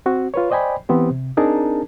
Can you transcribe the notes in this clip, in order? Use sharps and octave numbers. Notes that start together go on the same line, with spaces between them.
C4 F#4
F4 B4 C#5
C5 D5 D#5 G5 G#5 B5
E3 B3 C4 G4 C5
C3
C4 D4 D#4 G#4 A#4 A5